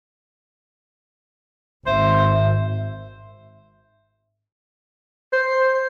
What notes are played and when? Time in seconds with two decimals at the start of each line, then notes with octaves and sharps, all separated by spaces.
1.87 G#1 G#2 C5 E5
5.32 C5